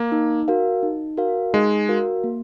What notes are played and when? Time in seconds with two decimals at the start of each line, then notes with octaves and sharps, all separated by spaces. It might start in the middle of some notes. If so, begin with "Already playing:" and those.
Already playing: A#3
0.12 D#4
0.48 F#4 A#4 F5
0.83 D#4
1.17 F#4 A#4 F5
1.53 G#3 D#4
1.89 F#4 A#4 F5
2.24 A#3